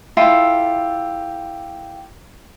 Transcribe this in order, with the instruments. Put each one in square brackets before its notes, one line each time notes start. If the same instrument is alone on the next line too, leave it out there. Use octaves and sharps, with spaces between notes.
[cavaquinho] E4 F4 G4 A4